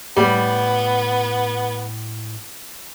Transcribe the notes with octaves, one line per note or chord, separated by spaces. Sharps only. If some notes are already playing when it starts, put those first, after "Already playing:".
A2 G3 B3